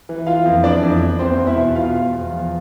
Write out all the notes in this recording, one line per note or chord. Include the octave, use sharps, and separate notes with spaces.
E3
E3 F4 F5
F2
E3 D4 D5
F2
F2
E2 C4 C5
E2
E4 E5
B2
B2 F4 F5
E2
E2
F3